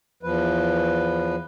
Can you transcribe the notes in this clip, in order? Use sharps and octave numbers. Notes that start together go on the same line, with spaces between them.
E2 F3 B4